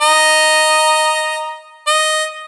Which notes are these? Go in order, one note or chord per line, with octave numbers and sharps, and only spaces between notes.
D#5 A#5
D#5